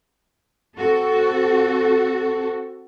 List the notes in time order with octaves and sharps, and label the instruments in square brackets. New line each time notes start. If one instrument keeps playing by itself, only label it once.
[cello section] C4 F#4 A4